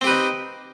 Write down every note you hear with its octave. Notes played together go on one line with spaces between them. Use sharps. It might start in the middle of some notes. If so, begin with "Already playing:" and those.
C4 D#4 G4 B4